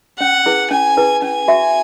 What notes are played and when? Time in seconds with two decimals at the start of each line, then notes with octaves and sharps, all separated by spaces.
0.20 C#4 F#5
0.46 E4 G#4 B4
0.71 C#4 G#5
0.97 E4 G#4 B4
1.22 C#4 G#5
1.48 F#4 E5 C#6